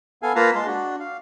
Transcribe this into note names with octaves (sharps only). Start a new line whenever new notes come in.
B3 A4 F5 G#5
A#3 F4 B4 F5 A5 A#5
G#3 A5 C6
D4 F#4
F5